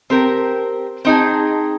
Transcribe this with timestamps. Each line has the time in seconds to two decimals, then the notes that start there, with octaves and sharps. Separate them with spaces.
0.10 C4 G4 A#4
1.05 C4 D#4 G#4